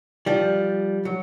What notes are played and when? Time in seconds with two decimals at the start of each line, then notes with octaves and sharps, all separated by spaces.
0.26 F3 G3
1.05 F#3